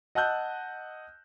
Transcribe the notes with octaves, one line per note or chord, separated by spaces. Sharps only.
D#5 F#5 A5 E6 F#6 G6